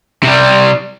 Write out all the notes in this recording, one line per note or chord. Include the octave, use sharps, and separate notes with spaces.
C3 G3